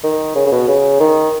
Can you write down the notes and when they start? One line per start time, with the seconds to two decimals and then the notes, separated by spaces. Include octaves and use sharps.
0.04 D#3
0.35 C#3
0.46 C#3
0.52 B2
0.68 C#3
1.00 D#3